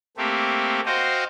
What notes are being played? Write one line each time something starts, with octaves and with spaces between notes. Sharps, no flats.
A3 A#3 C4 G4
F#4 C5 D#5 F5 G5